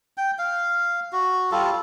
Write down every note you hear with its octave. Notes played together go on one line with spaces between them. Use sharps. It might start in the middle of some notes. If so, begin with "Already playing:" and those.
G5
F5
F#4
G3 F4 A4